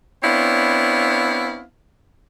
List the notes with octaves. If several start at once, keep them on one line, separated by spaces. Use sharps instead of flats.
B3 C4 D4 E4 C#5 F5